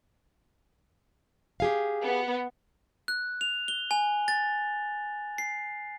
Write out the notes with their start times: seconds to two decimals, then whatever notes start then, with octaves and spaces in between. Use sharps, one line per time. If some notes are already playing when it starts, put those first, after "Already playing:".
1.60 G4 G#4 F5
2.04 B3
3.08 F#6
3.41 F7
3.68 G7
3.91 G#5
4.28 A6
5.38 C7